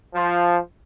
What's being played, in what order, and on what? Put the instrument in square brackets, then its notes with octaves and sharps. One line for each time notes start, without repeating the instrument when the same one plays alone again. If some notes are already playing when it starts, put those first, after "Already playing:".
[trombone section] F3